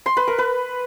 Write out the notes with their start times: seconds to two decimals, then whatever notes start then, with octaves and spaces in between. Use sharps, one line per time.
0.06 C6
0.17 B4
0.28 A#4
0.38 B4